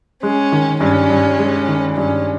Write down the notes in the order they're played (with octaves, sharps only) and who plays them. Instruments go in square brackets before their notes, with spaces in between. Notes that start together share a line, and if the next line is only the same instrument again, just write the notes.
[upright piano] G#3 [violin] C#4
[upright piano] D#3
[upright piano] G2 [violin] C#4
[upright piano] G2
G#3
D#3
[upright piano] G2 [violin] C#4